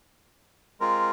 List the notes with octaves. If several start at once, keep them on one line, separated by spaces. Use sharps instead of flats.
G#3 C4 F4 A#4